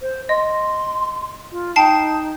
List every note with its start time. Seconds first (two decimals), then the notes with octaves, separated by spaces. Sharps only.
0.01 C5
0.29 D#5 C6
1.52 F4
1.76 D#4 G5 A5 C7